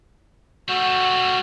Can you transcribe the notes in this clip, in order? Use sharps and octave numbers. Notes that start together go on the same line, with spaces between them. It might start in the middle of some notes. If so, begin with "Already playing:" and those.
G3 A3 F#4